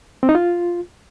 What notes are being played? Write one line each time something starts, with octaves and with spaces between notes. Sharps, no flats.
C4
D#4
F4